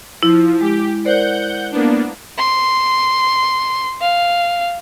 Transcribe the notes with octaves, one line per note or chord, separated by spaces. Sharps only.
F3 E4
G#3 G4
A#4 C5 D5 F#5 G6
A#3 B3 D4
C6
F5